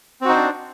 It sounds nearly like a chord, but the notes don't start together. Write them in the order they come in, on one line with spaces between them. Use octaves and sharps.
C4 F#4 D#4 C5 D4